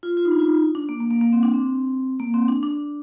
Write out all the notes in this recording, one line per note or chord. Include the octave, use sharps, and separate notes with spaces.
F4
F4
D#4
D4
F4
D#4
D4
A#3
A#3
A#3
A#3
C4
D4
C4
A#3
C4
D4
D4